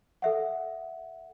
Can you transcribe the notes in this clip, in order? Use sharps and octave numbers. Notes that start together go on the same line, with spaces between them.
A4 E5 F#5